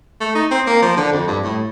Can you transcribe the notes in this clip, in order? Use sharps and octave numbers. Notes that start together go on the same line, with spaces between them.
A3
D#4
C4
A#3
F3
D3
F2
G2
A2